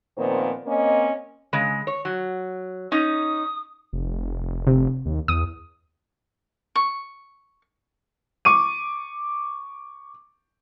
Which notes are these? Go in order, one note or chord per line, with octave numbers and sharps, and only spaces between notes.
A#2 D#3 F3 B3 C4 C5
A#3 C4 C#4 D#5
C#3 G#3
C#5
F#3
C#4 D#4 D#6
F1
C3
D#2
E2 D#6
C#6
C#6 D6 D#7